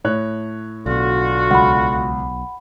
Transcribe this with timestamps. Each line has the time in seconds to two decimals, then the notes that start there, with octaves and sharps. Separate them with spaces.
0.04 A2 C#5 F#6
0.86 B1 B2 D3 F4 F#4
1.51 C#2 F#3 F#5 B5